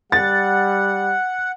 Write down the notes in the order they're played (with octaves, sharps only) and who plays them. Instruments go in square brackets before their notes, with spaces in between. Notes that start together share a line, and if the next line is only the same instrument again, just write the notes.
[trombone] G3 [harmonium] F#5 [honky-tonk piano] A6